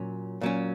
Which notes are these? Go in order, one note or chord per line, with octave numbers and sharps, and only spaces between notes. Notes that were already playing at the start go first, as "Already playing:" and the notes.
Already playing: A#2 F#3 C#4
A#2 F#3 C#4